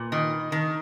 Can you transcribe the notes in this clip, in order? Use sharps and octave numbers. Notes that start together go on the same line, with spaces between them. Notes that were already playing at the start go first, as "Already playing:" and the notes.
Already playing: A#2 B4
D#3
D#3